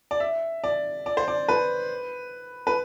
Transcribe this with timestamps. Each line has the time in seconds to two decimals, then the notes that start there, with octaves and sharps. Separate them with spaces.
0.11 D5
0.20 E5
0.64 D5
1.06 D5
1.17 C5
1.28 D5
1.48 B4
2.67 B4